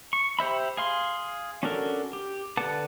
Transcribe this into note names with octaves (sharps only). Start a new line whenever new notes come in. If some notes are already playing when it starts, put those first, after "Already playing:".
C#6
G4 C5 E5 B5
G#4 F5 C6
C#4 D4 F#4 A4 A#4
G4
D3 B4 F#5 A5 D6